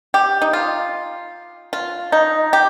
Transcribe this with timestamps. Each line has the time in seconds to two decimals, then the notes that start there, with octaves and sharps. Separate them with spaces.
0.14 G4
0.42 D#4
0.53 F4
1.73 F4
2.12 D#4
2.53 G4